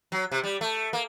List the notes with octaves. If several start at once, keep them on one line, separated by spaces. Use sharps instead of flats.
F#3
C3
G3
A3
A#3